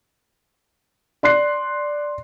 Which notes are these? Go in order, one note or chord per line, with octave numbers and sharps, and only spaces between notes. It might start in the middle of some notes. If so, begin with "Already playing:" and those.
D5 C6 F#6 C7